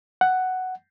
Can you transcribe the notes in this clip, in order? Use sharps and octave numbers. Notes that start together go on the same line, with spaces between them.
F#5